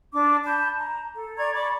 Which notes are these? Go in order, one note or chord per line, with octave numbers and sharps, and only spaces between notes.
D4 D6
A5 B5 G6
A#5
A4
D5 A#5 C#6 G#6
D5 B5 C#6 D6